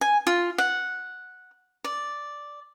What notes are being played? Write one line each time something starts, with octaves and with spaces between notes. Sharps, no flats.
G#5
F4
F#5
D5